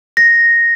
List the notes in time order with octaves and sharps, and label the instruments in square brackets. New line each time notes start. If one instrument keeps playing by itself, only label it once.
[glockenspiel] A#6